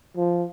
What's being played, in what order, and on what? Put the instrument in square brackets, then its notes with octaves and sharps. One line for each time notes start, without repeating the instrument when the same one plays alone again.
[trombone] F3